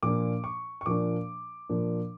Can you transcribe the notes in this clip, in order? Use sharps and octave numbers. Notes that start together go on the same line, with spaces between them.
A#2 F3 A#3 D4 D6
C#6
C#6
A#2 F3 A#3 D4 D6
A#2 F3 A#3 D4